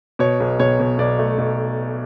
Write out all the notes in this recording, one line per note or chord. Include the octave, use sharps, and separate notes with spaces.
B2 C#5
B1
B1 C#5
B2
B1 D5
A3
B1